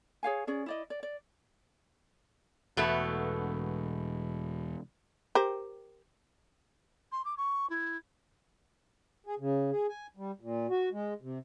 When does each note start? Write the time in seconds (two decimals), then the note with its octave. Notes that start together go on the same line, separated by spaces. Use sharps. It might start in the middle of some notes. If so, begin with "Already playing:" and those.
0.23 G#4 C#5 F5 G#5
0.47 C#4 G#4 D5
0.66 E4 D5 D#5
0.90 D5
1.03 D5
2.77 E1 B2 A3 B3
5.35 G4 A#4 C5
7.12 C6
7.25 D6
7.37 C#6
7.69 E4
9.26 G#4
9.39 C#3
9.72 G#4
9.89 G#5
10.17 G3
10.41 A#2
10.69 F#4
10.92 G#3
11.22 C3